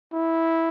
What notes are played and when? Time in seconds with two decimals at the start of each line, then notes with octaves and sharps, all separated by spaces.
0.13 E4